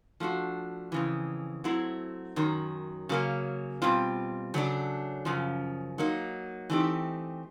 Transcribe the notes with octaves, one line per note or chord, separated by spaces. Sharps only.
F3 A3 D4 F#4
F2 C#3 E3
F#3 A3 C4 E4
F#2 D#3 F#3
C#3 F#3 A#3 C#4
B2 G3 C4 F4
C#3 F#3 A3 D4
F#2 C#3 F3
F#3 A#3 D#4
E3 A3 C4 D#4 G4